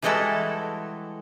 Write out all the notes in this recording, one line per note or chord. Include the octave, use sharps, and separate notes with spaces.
E3 G3 G#3 E4 F#4 A4